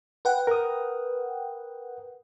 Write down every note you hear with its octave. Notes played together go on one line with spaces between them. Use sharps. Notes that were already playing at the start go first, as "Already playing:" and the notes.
B4 F#5 G5
A#4 D#6